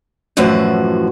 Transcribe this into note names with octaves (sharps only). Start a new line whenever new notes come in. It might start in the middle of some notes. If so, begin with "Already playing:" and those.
F#2 A2 E3 F3 F#4